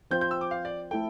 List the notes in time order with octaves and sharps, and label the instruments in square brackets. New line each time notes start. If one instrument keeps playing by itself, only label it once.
[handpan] F3 C4 F4 C5 [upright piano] G6
[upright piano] G6
E6
D6
F5
D5
[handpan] A3 E4 A4 [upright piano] G5